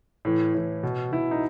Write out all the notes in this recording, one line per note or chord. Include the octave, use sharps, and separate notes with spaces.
A2 E3
A2 E3
B2
B2 E4
D#4